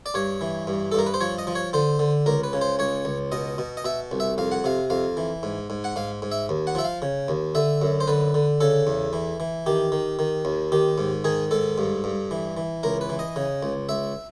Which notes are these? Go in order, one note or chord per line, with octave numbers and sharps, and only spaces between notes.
D5
G2 C#5
E3
G2
A4
G2 A#4
B4
C5
F3 C#5
D#5
F3
C#5
D3 C5
D3
C#2 A#4
B4
C#3
C5
C#2 C#5
C#2
B2 D#5
B2
D#5
B2 E5
C2
E5
F2 F5
F#5
C3 F5
F2 F5
E3
G#2
G#2
F#5
G#2 F5
G#2
E5
D#2
F#5
F3 E5
F5
C#3
D#2
D3 E5
F#2
C5
D3 B4
D3
C#3 A4
E2
E3
E3
D#3 G4
D#3
D#3
D#2
D#3 G4
G#2
D#3 G#4
G#2 A4
G2
G2
E3
E3
C#2 A#4
B4
E3
D#5
C#3
C#2
C#2 E5